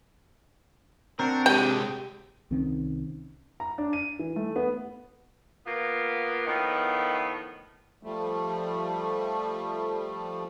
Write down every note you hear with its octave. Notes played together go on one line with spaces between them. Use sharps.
C4 D4 F#4 A#4
C3 G#3 G4 G5
C2 D#3 C4 C#4
A#5
D4
D#7
E3
A3
B3
A#3 B3 F4
A2 D#3 F3 B3
F3 G3 A3